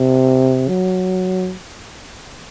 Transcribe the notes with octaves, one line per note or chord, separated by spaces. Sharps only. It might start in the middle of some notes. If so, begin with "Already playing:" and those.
Already playing: C3
F#3